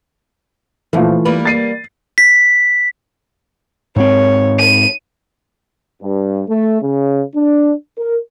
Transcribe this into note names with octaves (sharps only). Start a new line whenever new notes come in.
A#2 E3 F3 A3 F4
G3 A#3 B4
A6 C7 D#7
B6
G#2 C4 C#5
D#7
G2
A3
C#3
D4
A#4